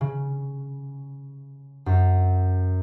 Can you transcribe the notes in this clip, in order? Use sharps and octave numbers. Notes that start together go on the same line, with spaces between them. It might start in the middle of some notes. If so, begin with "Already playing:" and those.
C#3
F#2